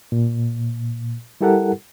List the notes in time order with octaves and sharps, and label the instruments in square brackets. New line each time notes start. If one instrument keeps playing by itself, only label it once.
[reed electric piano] A#2
G3 E4 G4 A4 A#4 F#5